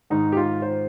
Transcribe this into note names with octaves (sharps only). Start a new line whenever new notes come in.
G#2 D#3 D#4
G4
F4
C5